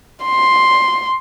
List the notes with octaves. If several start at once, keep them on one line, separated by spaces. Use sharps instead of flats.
C6